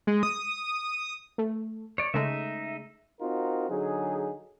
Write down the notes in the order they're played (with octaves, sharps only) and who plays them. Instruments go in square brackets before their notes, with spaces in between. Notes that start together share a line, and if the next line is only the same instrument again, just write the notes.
[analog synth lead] G#3
D#6
[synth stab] A3
[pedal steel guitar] C#5 D5
[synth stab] C#3 G#3 A3 [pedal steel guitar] D#4 E5
[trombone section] C4 D#4 F4 F#4 A#4
D3 F#3 D#4 G#4